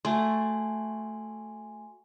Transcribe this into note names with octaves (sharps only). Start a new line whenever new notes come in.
A3 F#4 G#5 C6